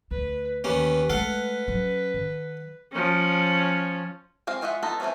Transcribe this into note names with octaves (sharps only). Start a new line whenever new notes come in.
D2 B4
D#2 A#3 C#4 B4
G#3 A3 A4 B4 F5 F#5
F#3 C#4
D#3
F3 C#4
G#3 C4 F5
G#3 F4 D#5 E5 F#5
B3 D#4 F4 A4 D#5
E3 A3 A#3 C4 C#4